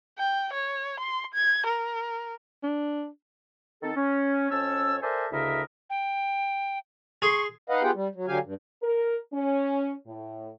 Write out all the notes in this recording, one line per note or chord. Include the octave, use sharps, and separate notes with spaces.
G5
C#5
C6
G#6
A#4
D4
D#3 C4 D#4 A4
C#4
F2 C#4 C#5 A5 E6
A4 A#4 C5 D5 E5 G#5
D2 C#3 E4 A#4 D#5 E5
G5
G#4 C6 C#6
D#4 B4 D#5 F5 F#5
B3 F4 G4 G#4 F#5 G5
G3
F#3
D3 F#3 G4 F5 G#5
G2
A#4
C#4
A2